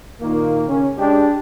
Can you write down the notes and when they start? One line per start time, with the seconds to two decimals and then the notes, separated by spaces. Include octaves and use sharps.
0.21 A#2 D#3 A#3
0.68 C#3 C#4
0.98 G#3 D4 G4